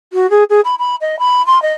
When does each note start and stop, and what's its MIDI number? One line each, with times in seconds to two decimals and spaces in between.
0.13 0.29 66
0.30 0.43 68
0.49 0.60 68
0.64 0.75 83
0.79 0.95 83
1.01 1.18 75
1.19 1.44 83
1.46 1.61 84
1.62 1.74 75